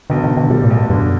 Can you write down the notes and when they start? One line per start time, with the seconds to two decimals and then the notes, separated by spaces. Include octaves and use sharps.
0.10 B1 D3
0.24 D3
0.30 B1
0.37 D3
0.50 B2 G3
0.64 A2
0.70 B1
0.77 A2
0.90 F#2 D3